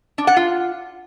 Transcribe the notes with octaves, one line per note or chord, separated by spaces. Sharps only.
D4
F#5
F4